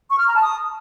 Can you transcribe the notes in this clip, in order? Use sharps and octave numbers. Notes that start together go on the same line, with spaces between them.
C#6
F6
A#5
A5
D#6